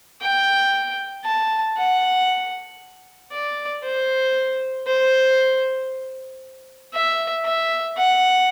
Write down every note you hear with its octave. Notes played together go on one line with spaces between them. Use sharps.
G5
A5
F#5
D5
C5
C5
E5
E5
F#5